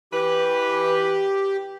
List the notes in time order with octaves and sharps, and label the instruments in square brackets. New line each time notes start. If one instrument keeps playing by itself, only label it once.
[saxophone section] E3 B4 [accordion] G4